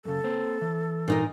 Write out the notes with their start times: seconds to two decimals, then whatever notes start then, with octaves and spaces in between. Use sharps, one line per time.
0.05 F#2 C#3 A4
0.24 A#3 C4 C5
0.61 E3
1.08 A#2 D#4 A#4